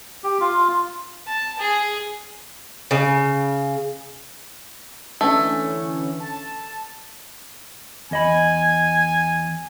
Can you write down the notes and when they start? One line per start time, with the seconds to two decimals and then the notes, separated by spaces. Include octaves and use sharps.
0.24 G4
0.41 F4
1.26 A5
1.59 G#4
2.91 C#3
5.21 D3 E3 A3 C#4
6.20 A5
8.11 E2 D#5 G#5 B5